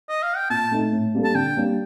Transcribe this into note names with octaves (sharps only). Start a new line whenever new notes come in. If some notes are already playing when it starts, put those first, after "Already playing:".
D#5
F5
G5
A#2 A5
A3 D#4
A2
G3 A#3 D4 A4
A5
D3 G5
G3 A#3 D4